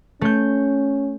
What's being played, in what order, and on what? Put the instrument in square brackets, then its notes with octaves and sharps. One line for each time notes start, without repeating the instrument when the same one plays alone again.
[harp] A3 G6 [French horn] C#4